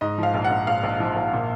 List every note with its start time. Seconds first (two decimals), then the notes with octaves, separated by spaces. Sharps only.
0.01 G#2 D#5
0.18 F3 F5
0.34 A#1
0.44 F#5
0.51 A#1
0.67 A#1 F5
0.83 A#1
1.00 F3
1.16 A#1
1.33 A#2